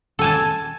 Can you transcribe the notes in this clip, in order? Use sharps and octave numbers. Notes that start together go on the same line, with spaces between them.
A4 G#5 A5